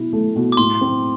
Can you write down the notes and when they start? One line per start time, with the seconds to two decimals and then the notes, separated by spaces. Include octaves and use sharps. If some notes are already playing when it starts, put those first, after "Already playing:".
Already playing: B2 E4
0.13 A3
0.36 B2
0.52 D6
0.57 A2 C6
0.81 C4